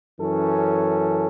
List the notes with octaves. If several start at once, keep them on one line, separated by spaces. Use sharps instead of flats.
F#2 E3 C#4 A4